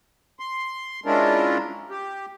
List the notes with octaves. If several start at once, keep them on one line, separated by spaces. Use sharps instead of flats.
C6
G#3 C#4 D4 E4 F4 A#4
G4